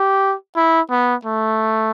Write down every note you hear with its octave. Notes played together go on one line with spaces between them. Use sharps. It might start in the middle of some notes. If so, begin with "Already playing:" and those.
Already playing: G4
E4
B3
A3